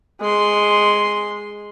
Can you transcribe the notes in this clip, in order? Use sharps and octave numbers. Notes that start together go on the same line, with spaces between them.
G#3 C6